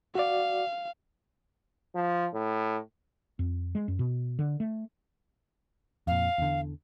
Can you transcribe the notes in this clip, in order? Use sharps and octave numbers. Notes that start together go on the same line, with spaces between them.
F#4 D5 F5
F3
A2
F2
G#3
F#2
B2
D3
A3
F2 A#2 F5
E2 D3